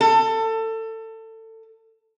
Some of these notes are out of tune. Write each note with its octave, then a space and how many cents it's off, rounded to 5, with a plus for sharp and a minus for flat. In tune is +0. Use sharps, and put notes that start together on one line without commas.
A4 +25